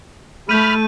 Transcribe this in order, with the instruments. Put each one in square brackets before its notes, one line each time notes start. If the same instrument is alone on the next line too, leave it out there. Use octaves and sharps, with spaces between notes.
[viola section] A3 [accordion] B5 F6 [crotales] G6 D#7